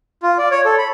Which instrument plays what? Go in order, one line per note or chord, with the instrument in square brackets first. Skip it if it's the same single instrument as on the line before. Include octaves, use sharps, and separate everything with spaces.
[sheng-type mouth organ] F4
D5
C#5
A4
B5